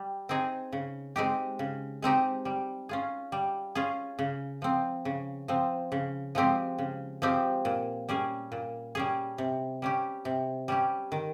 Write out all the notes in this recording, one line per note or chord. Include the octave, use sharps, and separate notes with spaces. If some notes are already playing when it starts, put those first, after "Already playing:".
Already playing: G3
C4 D#4 G#4
C#3
G#3 C4 D#4 G4
C#3
G#3 C4 D#4 G4
G3
C#4 F4 G#4
G3
C#4 F4 G#4
C#3
F3 C4
C#3
F3 C4
C#3
F3 G#3 C4 G4
C#3
F3 G#3 C4 G4
A#2
G3 C#4 G#4
A#2
G3 C#4 G#4
C3
G3 C#4 G4
C3
G3 C#4 G4
D#3